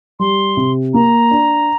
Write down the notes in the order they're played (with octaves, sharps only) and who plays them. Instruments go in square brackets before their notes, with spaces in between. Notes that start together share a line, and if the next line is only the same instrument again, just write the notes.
[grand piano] G3 [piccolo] C6
[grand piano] C3
[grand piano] A#3 [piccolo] A#5
[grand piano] D4